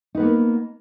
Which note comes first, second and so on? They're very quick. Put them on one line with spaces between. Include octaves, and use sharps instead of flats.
D#4 B4 B3 A#3